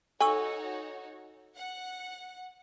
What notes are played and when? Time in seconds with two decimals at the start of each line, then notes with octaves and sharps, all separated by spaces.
0.20 D#4 F#4 A4 C#5 G#5 C#6 E6
1.56 F#5